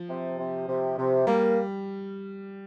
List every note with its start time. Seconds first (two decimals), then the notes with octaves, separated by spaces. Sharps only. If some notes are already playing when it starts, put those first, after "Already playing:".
Already playing: F3
0.09 C3
0.38 C3
0.68 C3
0.97 C3
1.27 G3 A#3